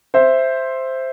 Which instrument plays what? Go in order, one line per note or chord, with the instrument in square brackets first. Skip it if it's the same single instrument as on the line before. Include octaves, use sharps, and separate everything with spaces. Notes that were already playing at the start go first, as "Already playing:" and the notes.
[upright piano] C5 E5